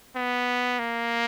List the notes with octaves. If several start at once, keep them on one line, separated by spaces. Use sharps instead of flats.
B3
A#3